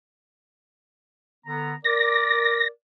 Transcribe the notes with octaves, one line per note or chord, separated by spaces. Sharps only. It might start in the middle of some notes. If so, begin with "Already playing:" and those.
D3 B3 A#5
A#4 D5 A#6